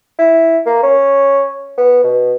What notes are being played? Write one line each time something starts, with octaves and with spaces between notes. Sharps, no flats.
E4
A#3
C#4
B3
B2